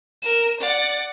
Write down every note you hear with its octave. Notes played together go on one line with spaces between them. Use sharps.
A#4 E7
D5 F#5